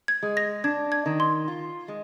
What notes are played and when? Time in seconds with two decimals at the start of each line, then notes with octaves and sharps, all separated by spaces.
0.08 G#6
0.23 G#3
0.37 A#6
0.64 D4 G#6
0.92 G#6
1.06 D#3
1.20 C6
1.48 F4
1.88 G#3